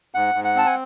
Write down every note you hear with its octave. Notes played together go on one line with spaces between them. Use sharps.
G#2 F#5
G#2
F#5
C4 A5
G#5